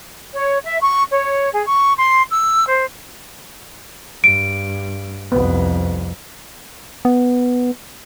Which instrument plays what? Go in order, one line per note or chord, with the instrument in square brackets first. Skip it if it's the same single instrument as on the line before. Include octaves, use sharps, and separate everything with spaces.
[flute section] C#5
E5
C#6
C#5
G#4
C#6
C6
E6
C5
[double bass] G2 [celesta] D7
[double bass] C2 F2 [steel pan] B3
[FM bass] B3